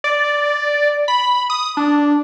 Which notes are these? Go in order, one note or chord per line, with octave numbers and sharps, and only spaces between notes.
D5
B5
D#6
D4